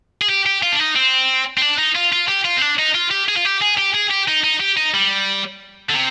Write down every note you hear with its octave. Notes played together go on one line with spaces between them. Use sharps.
G#4
G4
G4
F4
D4
D#4
C4
C4
D4
D#4
F4
F4
G4
F4
C4
D4
D#4
F4
G4
G#4
F4
G4
G#4
G4
G#4
G4
D#4
D#4
G4
D#4
G3
D3
C3